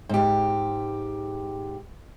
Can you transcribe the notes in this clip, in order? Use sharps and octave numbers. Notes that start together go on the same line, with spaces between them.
G#2 G4